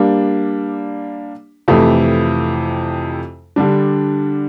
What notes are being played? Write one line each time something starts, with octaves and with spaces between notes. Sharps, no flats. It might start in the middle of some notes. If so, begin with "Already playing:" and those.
Already playing: G3 A#3 D4
F2 C3 E3 A3 E4
D3 G3 D4